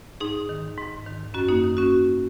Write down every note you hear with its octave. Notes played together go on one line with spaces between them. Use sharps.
G#2 D#4 G#4
D#3
G#2
D#3
F#2 C#4 F#4
A#3 D#4
D#3
C#4 F#4